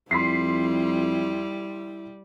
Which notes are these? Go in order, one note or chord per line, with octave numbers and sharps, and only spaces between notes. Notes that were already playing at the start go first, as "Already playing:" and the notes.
F2 G3 E4 C6 B6 C7